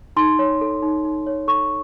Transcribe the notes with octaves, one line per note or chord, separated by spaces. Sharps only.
D#4 C6
C#5
A4
D#4
D#4
C#5
A4 C#6